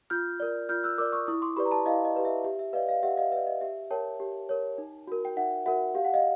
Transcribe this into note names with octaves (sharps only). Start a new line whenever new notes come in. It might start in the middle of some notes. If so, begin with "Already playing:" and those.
F4 F6 G6
A#4 D5
F4 F6 G6
E6 F#6
A#4 D5 D6 E6
C#6 D#6
E4 C#6 D#6
C6 D6
G4 B4 D5 B5 C#6
A#5
A5 B5
E4 D#5 F5
D#5
G4 B4 D5
E5
G4 E5
E5
B4 D5 D#5 F5
D#5 F5
G4 E5 F#5
D#5 F5
B4 D5 E5
D#5
G4 E5
A#4 C#5 G5 A5
G4
A#4 C#5
D#4
F#4 A#4
G5
D#4 E5 F#5
F#4 A#4 E5 F#5
G4 F5
F#5
D#5 F5